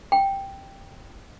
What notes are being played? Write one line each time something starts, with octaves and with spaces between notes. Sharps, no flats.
G5